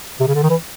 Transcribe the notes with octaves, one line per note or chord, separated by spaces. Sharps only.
C3
C#3
D3
D#3
E3